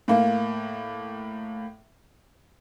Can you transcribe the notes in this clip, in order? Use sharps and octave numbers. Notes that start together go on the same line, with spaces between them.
A2 A#3